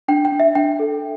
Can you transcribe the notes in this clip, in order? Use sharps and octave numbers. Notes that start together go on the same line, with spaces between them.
D4 G5
G5
D4
E5
D4 G5
A4